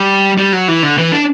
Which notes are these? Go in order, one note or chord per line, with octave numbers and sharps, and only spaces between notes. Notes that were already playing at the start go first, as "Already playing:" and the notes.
Already playing: G3
G3
F#3
E3
D3
E3
D4